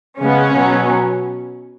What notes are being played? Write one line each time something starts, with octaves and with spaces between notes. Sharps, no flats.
C#3 G#3 B3 C#4
B2 F#3 B3